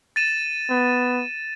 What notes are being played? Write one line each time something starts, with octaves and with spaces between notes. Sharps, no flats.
A6 D#7 E7
B3